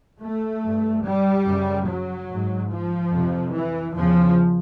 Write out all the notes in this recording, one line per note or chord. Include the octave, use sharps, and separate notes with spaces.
A3
G2
G3
F#2 C#3
F#3
G#2
F3
F2 C3
E3
E2 C#3 F3